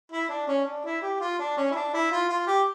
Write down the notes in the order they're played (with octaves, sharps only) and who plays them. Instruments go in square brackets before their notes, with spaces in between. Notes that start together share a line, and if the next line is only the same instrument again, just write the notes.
[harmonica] E4
D4
C#4
D4
E4
G4
F4
D4
C#4
E4
D4
E4
F4
F4
G4